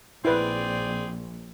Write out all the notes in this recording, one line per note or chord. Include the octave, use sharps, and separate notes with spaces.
A#1 C4 E4 G#4 B4 D5